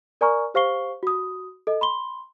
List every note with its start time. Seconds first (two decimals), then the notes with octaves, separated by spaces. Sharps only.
0.21 A#4 D5 G#5 A#5 C#6 F6
0.54 G4 C5 F5 C#6 C7 G7
1.03 F#4 D#6
1.67 A4 D#5
1.81 B5 C6 G7